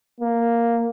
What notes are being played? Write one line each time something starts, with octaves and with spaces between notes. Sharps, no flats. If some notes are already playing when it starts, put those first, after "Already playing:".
A#3